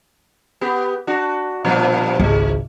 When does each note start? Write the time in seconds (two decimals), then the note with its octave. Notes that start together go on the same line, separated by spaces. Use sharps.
0.61 B3 G4
1.07 D4 F#4
1.65 G2 A#2 F3
2.19 G#1 C#2 G#2 G#3